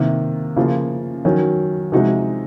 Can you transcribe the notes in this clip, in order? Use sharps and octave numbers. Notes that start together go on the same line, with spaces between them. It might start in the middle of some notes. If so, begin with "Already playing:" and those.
Already playing: C3 D#3 A#3
C#3 F3 A#3 F4
D#3 F#3 C#4 F#4
C3 F3 G#3 D#4 F#4